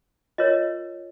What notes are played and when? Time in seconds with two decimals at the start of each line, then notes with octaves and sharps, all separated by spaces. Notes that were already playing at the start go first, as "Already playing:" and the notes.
0.38 F4 A#4 C#5 D#5